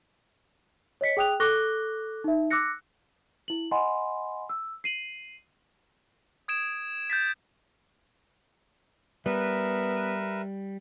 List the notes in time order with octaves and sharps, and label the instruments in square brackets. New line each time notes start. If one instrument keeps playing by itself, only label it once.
[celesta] C#5 D#5 B6 C#7
G#4 G5 D#6 F#6 F7
A4 C#6 D6 F#6 A#6 G7
D#4 E5
D6 E6 F#6 A#6 C#7
E4 F#7
D#5 F#5 G#5 B5 C6
E6
C7 D#7 F#7
[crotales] D#6 G#6 D7 E7
G6 A6 B6
[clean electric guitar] G3 [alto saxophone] B3 [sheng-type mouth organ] A#4 B4 E5